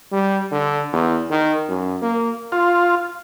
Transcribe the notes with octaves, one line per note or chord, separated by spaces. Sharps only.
G3
D3
E2
D#3
F#2
A#3
F4